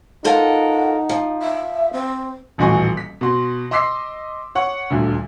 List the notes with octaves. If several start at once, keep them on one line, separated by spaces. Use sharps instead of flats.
D#4 F4 A4 A#4 F#5
F3
E5
C4
D#1 A1 E3 F#4 G#5 C#6
B6
B2 F#4 C6
D#5 C6 D6 E6 B6 C7
C#5 F#5 C#6
D#1 D2 D3